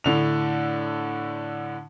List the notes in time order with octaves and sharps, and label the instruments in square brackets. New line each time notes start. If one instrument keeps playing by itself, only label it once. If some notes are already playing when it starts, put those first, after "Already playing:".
[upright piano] A2 D3 F7